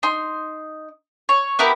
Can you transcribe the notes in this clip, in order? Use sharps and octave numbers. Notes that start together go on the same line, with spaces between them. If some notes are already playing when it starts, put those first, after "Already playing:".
D#4 C6
C#5
B3 E4 G4 A#4